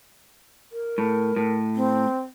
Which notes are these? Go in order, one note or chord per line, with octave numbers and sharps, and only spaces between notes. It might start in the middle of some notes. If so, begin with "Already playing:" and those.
A#4
A2
A2
C4